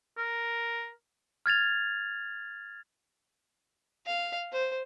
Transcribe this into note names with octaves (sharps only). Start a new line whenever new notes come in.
A#4
F6 G#6 A6 F7
F5
C5